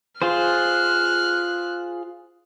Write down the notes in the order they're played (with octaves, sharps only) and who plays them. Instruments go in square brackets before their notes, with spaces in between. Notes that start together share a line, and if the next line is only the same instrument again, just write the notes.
[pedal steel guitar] F4 G#4 C5 [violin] F6 F#6